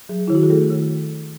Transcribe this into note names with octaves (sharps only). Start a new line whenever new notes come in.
F#3 G#4
D#3 E4
F#4
G#4
A3 A4
D#3